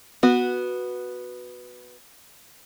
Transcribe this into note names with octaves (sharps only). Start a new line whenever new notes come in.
B3 F#4